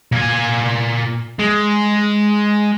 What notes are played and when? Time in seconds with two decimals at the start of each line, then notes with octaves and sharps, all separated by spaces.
0.12 A#2 G#5
1.39 G#3